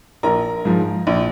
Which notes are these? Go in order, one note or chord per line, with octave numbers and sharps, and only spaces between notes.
A#1 A#4 A#5
G#2 F3
A#1